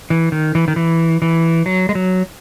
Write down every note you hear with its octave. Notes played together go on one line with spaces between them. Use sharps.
E3
D#3
E3
D#3
E3
E3
F#3
G#3
F#3